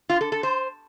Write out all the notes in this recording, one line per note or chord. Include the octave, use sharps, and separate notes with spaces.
F4
A4
A4
C5